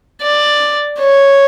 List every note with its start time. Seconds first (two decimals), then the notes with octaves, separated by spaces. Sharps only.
0.22 D5
0.99 C#5